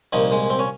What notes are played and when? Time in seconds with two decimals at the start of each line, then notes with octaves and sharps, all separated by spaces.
0.13 C2 A#2 F3 D#4
0.32 G#3
0.50 C4
0.59 C#4